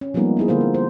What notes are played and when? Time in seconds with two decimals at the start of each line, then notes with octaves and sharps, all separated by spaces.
0.01 C#4
0.14 F3 G3 G#3 A#3 B3 D#4
0.37 B3 E4 G#4
0.48 D3 A#3 F4 C5
0.61 C4
0.74 C5